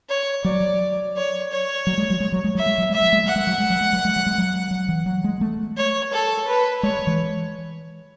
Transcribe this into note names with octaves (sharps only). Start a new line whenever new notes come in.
C#5
F#3 D5
C#5
C#5
F#3
G#3
F#3
G#3
F#3
G#3
F#3 E5
G#3
F#3
G#3 E5
F#3
G#3
F#3 F#5
G#3
F#3
G#3
F#3
G#3
F#3
G#3
F#3
G#3
F#3
F#3
E3
F#3
G#3
A3
C#5
A4
B4
G#3 C#5
E3